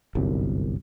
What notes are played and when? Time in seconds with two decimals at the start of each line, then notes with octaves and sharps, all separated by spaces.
0.15 G1 C2 F#2